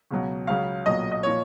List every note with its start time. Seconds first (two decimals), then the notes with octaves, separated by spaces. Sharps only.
0.11 C#2 B2 F#3
0.47 C#2 C#3 F#3 F5
0.86 B1 A#2 F#3 D#5
1.12 D#5
1.23 A#2 F3 C#5